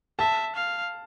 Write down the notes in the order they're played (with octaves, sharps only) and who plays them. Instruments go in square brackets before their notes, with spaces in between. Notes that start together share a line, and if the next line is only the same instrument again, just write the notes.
[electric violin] E5 [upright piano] A5
[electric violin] F5